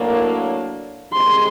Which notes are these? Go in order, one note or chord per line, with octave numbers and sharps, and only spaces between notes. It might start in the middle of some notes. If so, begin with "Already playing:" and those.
Already playing: A2 F#3 A#3 D4
C3 D#3 G#3 C6